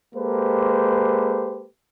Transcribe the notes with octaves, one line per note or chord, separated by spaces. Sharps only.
G#3 A#3 G4 A4 B4 C5